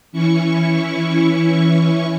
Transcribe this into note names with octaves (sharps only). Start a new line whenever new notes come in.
E3 C#4 E4 C#6